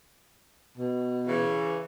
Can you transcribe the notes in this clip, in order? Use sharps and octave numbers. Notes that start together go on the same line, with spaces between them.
B2
C#3 E3